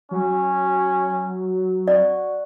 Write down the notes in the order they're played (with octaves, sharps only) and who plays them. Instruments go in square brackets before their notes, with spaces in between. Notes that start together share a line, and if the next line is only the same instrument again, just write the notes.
[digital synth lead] F#3 [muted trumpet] C#4
[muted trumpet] F#4 [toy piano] D5